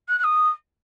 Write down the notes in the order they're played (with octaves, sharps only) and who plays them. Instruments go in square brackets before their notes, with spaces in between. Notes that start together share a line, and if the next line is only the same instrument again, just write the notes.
[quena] F#6
F#6
D#6